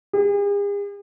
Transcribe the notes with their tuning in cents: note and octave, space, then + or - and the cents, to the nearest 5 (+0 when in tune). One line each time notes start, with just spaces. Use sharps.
G#4 -45